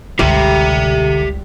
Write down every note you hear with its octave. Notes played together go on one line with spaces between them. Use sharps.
G1 C#2 D3 G3 G4 E5